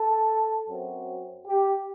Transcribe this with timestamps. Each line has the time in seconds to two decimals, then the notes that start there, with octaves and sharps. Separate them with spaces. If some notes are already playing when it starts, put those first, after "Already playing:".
Already playing: A4
0.68 F#2 F#3 C4
1.47 G4